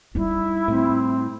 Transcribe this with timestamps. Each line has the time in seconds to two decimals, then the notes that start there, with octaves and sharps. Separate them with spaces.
0.15 G3 D#4 E4
0.68 A2 C4